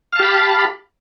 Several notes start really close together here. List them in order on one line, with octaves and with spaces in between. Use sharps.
F5 A5 G4 B5